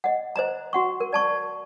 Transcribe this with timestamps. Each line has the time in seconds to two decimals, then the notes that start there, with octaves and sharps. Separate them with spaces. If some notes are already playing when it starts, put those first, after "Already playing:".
0.04 D#5 F#5
0.36 C5 D#5 A#5
0.73 F#4 F#5 C#6
1.00 A#4
1.13 D5 A5 C#6